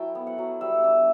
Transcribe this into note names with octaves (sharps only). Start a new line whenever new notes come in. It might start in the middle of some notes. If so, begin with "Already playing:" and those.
Already playing: F#3 A3 E4 G5 A5
B3
F#5
F#3
G3 E5
D4